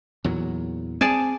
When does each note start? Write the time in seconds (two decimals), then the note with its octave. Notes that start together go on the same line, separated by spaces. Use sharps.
0.24 E2 A#2 F#3
1.01 C4 G#4 D5 A5